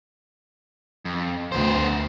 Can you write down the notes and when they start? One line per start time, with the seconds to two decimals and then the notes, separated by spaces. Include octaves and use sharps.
1.05 F2
1.52 D2 B3 C5